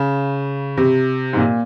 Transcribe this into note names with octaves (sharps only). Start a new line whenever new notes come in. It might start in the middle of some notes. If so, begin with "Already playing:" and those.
Already playing: C#3
C3
G#2
A#2